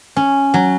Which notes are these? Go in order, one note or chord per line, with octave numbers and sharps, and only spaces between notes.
C#4
F#3